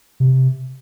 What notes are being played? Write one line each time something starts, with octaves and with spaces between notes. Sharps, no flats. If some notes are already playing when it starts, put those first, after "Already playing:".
C3